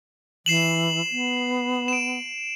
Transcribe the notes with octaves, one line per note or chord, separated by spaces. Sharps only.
E3 C7 E7 F#7
B3
D7 E7